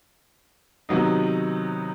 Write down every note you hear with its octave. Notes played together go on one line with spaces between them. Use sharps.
C3 D#3 F#3 B3 D#4